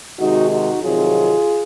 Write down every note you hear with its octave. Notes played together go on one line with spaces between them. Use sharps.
C3 D#3 G#3 D#4 F#4
D#4 F#4
F2 C3 D#3 F#3 F4 G#4